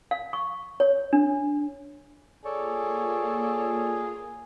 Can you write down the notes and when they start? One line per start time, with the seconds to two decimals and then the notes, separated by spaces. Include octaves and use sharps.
0.11 F5
0.33 C#6
0.80 C#5
1.13 D4
2.45 A#3 F4 G#4 A4 C#5 D5